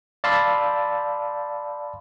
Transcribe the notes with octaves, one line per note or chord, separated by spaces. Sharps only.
D5 F5 A5 B5 C6 E6